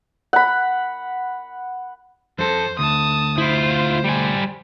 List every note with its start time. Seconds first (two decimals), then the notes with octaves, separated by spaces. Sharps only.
0.33 F#5 B5
2.39 F2 A4 C5
2.79 D2 A5 D#6
3.38 E4 F4 C5
4.05 G3 G#5